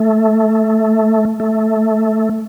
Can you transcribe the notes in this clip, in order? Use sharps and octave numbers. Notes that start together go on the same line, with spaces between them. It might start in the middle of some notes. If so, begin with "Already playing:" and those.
Already playing: A3
A3